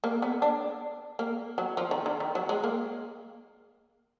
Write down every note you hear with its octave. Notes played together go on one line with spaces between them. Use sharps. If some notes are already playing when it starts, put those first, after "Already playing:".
A#3
B3
D4
A#3
F#3
F3
D#3
D3
D#3
F#3
G#3
A#3